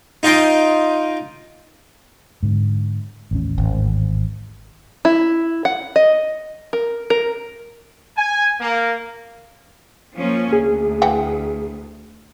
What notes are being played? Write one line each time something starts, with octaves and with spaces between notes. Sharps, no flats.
D#4 F4 D#5 G5 C6
G#2 D3
A1 D#2 C#4
G#1
E4
F#5
D#5
A#4
A#4
G#5
A#3
F3 A#3 C#4
D2 G#4
E3 F#5 G5